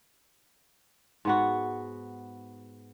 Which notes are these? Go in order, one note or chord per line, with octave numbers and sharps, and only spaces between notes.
G#2 B3 F#4